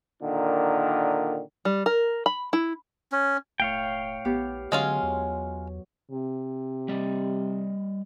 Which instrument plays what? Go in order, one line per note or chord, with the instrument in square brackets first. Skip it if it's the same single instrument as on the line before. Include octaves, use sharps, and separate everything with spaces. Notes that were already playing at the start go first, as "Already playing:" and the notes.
[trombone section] A#2 D3 D#3
[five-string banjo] G3
A#4
B5
E4
[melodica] C#4
[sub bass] E1 [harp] A2 [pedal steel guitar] C#5 F5 G5
[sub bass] A#1 [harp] B3 G4
[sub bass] D3 [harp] F#3 [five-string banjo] G#3 C#4 F4
[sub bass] E2
[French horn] C3
[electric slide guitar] G3 D5 D#5